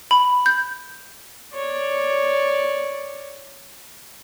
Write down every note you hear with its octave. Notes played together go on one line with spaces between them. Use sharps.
B5
G6
C#5 D5